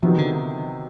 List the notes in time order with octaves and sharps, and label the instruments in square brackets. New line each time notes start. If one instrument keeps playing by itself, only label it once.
[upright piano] C3 D#3 F#3 B3 D#4 [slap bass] F3
[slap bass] D3
[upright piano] D#4